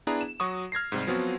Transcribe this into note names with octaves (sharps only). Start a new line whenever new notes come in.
B3 D4 E4 G#4 A#5
E7
F#3 F#4 C#6 D#6
F6 G#6 A#6 C7
G#2 C3 G3
F3 F#3 B3 C4 F4 F#4